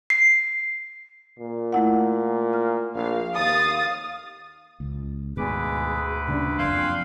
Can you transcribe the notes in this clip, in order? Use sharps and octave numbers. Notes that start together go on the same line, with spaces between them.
C7
A#2
A3 E4 F#5
F6
A#1 F5
D#2 F5 D#6 A6
C#2
D2 G#2 B2 D#3 G#4 B4 D6
A#2 C#3 G3 D4
F#1 F2 F5 G5 G#5 C6 E6 F#6